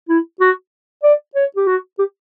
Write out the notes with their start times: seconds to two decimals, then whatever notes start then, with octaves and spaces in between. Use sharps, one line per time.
0.09 E4
0.41 F#4
1.03 D5
1.35 C#5
1.56 G4
1.67 F#4
1.99 G4